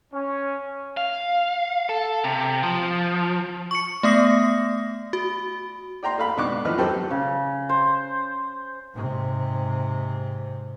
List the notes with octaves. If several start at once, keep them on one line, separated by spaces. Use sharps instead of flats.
C#4
F5
A4
C3
F3
C#6 C#7
A3 B3 D#6 A#6
F#4
D5 G5 A#5 C6
A3 F5 B5
G#2 B2 D4 C#6 D6 F#6
A2 E3 F3 D#4 B4 F6
F#2 C4 G4 A4 B4 C5
C#3
C5
G#2 C3